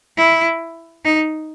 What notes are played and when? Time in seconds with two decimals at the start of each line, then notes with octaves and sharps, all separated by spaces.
0.17 E4
1.04 D#4